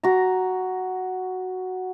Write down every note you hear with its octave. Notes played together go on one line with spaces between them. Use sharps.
F#4 A#5